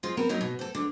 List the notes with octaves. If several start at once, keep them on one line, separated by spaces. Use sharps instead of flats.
G#3 C4 F4
B3 C4 A#4
F#3 A#3 D#4 F#4
B2
C4 A4
D3